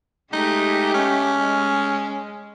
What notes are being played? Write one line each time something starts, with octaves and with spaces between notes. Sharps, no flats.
G#3 A3 D#4 G4
C#4
G#3